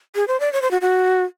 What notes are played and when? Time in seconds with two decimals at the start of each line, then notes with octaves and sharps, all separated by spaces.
0.15 G#4
0.28 C5
0.40 D5
0.53 C#5
0.62 C5
0.71 F#4
0.81 F#4